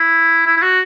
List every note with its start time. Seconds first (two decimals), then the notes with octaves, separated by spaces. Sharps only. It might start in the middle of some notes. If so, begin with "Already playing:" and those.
Already playing: E4
0.47 E4
0.57 E4
0.63 F#4